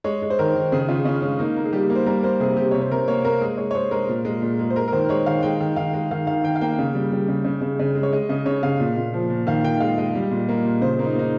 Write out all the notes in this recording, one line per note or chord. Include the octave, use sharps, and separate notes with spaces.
G#3 C#5
G#3
C5
D#3 A#4
D#3
C#3 G#4
C#3 F4
C#3 C#4
G#3 C#4
A#3 D#4
A#3
G#4
G3 G4
A#3
C5
G3 A#4
A#3 C5
C3 G#4
C3 G4
C3 C#5
C5
C3 A#4
A#3 C#5
A#3 A#4
G#3 G#4
G#3 C#5
C#5
G#3 C5
G#3 A#4
A#2
G#3
A#2
G#3
C5
G#3 A#4
A#4
D#3 C5
G#3 C#5
D#3 F5
G#3 G5
D#3
D#3 F5
G#3
D#3 F5
D#3 F5
D#3 G5
F5
A#3 G5
C#3
G3
G3
C#3
C#3
C#3
C#3
G#3
C#5
G#3 D#5
C#3 D#5
C#3 C#5
C#3 F5
A#2
A#2
F3
A#2
D#3 F5
D#3 G5
G#3 F5
G#3 D#5
G3
A#2
A#3
A#2
C#3 C5
A#3 D#4
A#3 D#4